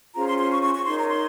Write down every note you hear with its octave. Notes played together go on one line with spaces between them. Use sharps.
C#4 F4 G#4 C5 A#5
C6
C6
C#6
C#6
C#6
D#4 A#4 C#5 C6
A#5
C6